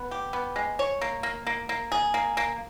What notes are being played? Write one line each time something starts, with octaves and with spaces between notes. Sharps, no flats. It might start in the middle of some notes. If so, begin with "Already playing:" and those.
Already playing: B3
G4
B3
G#3
C#5
A#3
A#3
A#3
A#3
G#4
A#3
A#3